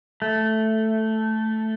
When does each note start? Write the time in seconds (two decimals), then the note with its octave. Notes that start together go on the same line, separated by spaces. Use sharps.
0.22 A3